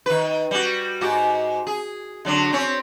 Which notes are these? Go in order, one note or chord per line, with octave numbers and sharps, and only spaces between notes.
D#3 B4
G3 F#4
G#2 F#4 G4
G#4
D3 F#3 D4
C4 C#4 C#5